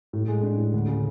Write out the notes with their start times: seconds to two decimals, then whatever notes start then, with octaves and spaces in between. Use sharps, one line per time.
0.13 A2
0.28 G#3
0.43 D4
0.58 A2
0.74 D2
0.88 C#3